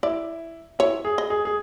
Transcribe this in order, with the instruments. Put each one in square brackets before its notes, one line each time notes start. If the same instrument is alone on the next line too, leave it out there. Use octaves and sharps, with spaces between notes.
[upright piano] E4 [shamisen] D5
[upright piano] E4 [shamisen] C#5
[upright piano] G#4
[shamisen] D#5
[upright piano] G#4
G#4